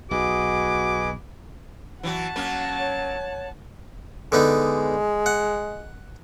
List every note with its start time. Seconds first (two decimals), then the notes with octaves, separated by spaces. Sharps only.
0.11 B1 F#4 G#4 B4 D#5 D6
2.03 E3 F#3 F#4 F#5 A5
2.36 F#3 A#3 C#4
2.79 C#5
4.32 D3 G#3 B3 D#4
5.26 F#5